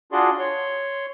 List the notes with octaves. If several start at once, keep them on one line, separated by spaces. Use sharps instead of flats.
D4 F4 F#4 G#4 D5 C6
C#5 C6